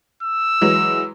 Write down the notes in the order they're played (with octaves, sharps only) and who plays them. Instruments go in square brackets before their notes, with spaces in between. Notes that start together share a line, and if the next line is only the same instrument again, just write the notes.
[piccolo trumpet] E6
[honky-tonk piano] E3 F#3 G#3